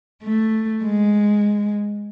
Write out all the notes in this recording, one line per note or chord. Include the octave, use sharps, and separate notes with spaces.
A3
G#3